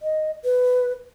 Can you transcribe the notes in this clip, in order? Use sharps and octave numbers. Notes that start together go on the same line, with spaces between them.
D#5
B4